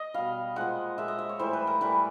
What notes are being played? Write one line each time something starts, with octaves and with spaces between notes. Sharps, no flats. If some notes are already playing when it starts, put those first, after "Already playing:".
Already playing: D#5
B2 G3 F5
A#2 F3 G#3 F#5
A#2 F3 G#3 E5
D#5
E5
C#5
A2 E3 G3 C5
B4
A#4
A2 E3 G3 B4